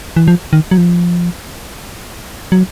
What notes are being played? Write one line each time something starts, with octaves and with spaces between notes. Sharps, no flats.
E3
F3
D#3
F#3
F3
F#3